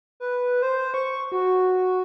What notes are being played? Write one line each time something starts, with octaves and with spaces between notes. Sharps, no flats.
B4
C5
C#6
F#4